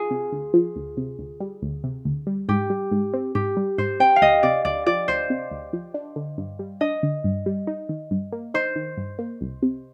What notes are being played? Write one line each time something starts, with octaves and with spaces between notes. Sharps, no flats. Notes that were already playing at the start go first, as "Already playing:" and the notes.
Already playing: F4 G#4
C3
D2
F3
D2
C3
D2
G3
D2
C3
D2
G3
G#2 G4
G3
G#2
C4
G#2 G4
G3
G#2 C5
C4 G5
F5
D2 D#5
C3 D5
D2 D5
F3 D5
D2 C5
C3
D2
F3
D4
D3
G2
G3
D4 D#5
D3
G2
G3
D#4
D#3
G2
A#3
D#4 C5
D#3
G2
A#3
C2
C3